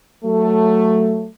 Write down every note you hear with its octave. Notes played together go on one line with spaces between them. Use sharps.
F#3 A3